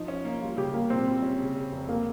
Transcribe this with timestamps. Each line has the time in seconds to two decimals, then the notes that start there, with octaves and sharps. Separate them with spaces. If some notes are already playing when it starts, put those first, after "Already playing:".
Already playing: F3 D#4
0.08 C#4
0.25 A#3
0.41 G3 F4
0.57 C#3 G4
0.74 G3 A#3
0.90 A#2 C4
1.06 G3
1.23 C#4
1.40 C#3
1.56 C#3
1.73 F1
1.89 G#3 A#3